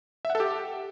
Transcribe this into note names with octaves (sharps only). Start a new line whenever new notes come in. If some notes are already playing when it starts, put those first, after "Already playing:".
E5
F#5
A4
G4